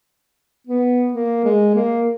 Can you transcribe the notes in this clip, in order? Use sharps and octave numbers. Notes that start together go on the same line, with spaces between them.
B3
A#3
G#3
A#3